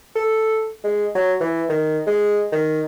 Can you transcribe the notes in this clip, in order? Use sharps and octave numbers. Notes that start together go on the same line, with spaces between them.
A4
G#3
F#3
E3
D#3
G#3
D#3